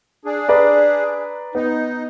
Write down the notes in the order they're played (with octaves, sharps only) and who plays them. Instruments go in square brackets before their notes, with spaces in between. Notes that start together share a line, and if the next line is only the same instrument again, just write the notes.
[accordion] D4 G#4
[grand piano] B4 D5 A#5
[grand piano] B3 [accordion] D#4